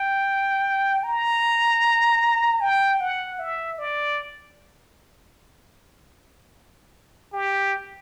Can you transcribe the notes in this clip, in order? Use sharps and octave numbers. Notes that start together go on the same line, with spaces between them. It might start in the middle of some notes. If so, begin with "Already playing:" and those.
Already playing: G5
A#5
G5
F#5
E5
D5
G4